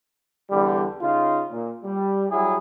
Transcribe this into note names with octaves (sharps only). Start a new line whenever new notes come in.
E2 D3 G3
C#3 D#4 F4
A#2
G3
F#3 G3 E4 G4 G#4